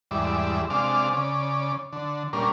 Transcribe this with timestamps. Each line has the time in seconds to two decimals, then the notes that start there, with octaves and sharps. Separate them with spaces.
0.11 E2 G#2 G3 D5 E5
0.70 C3 G#3 D4 D5 F5
1.13 C#3 D5
1.92 D3
2.33 A#2 G3 C#4 D4 A#4